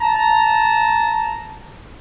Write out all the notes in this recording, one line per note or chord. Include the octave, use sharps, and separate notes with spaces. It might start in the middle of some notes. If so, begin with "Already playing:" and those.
A5 A#5